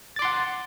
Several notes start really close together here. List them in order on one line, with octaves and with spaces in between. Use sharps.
A6 D6 C6 F#5